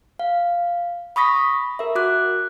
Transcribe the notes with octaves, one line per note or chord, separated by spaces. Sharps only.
F5
B5 C#6 D#6 A#6 B6
A#4 E5
F#4 D6 F#6